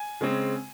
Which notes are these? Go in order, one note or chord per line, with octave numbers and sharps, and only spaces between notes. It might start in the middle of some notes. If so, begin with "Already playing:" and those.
Already playing: G#5
C#3 G#3 C4